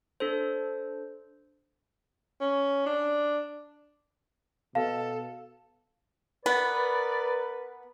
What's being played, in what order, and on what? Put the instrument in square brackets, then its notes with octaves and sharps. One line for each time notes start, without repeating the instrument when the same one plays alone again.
[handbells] D4 A4 C5
[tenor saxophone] C#4
D4
[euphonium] B2 [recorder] A4 [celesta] F5 [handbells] A5
[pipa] B3 [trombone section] A#4 B4 [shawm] D5